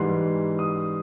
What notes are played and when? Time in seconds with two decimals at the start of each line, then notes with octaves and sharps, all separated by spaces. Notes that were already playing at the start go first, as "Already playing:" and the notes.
Already playing: G#2 E3 G3 C6
0.59 D#6